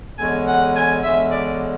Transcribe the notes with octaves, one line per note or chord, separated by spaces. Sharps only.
E2 D3 G#3 C#4 G#5
F#5
G#5
E2 D3 G#3 C#4 E5
D5